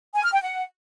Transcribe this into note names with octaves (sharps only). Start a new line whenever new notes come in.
G#5
F6
G5
F#5